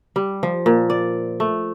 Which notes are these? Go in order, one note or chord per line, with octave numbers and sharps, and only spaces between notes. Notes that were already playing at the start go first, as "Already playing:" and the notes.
G3
F3
A#2
D5
A3